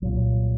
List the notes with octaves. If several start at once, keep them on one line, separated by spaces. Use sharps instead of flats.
C2 A#2 F#3